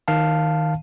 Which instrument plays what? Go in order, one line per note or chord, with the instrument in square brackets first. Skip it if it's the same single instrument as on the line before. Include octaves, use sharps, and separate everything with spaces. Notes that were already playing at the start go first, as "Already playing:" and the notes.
[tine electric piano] D#3 F5 A5